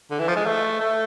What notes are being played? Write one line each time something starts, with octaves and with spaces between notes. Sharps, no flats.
D3
E3
F3
G#3
A3
A3